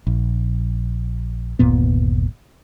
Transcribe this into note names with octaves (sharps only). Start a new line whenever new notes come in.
A#1
G1 D#2 A#2 B3